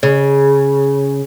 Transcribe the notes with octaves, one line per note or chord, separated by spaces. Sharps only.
C#3